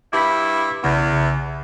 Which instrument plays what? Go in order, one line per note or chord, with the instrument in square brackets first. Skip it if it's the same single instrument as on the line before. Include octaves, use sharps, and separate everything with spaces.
[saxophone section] G2 E4 [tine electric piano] D6 G6 B6
[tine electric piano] B1 C#3 F#5 [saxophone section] E2